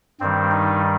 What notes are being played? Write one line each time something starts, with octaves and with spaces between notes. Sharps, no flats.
G2 D#3 G3 C4
D#4